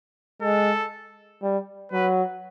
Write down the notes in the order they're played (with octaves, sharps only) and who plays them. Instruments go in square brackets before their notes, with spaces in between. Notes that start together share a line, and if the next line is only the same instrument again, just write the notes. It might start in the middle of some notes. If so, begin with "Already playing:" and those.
[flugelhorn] G#3 [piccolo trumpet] A4
[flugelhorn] G3
[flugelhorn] F#3 [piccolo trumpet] B4